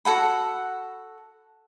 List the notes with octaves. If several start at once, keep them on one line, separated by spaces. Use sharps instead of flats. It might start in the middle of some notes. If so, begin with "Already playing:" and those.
F#4 A4 F#5 B5